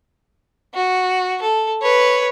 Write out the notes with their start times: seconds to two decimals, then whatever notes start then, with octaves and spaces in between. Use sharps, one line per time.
0.74 F#4
1.42 A4
1.82 B4 C#5